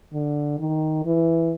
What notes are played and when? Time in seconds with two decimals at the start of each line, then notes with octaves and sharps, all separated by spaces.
0.13 D3
0.60 D#3
1.05 E3